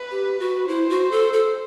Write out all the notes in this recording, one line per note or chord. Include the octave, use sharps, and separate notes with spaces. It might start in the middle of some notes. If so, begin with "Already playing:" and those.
Already playing: B4
G4
F#4
E4 C5
F#4
A4
A4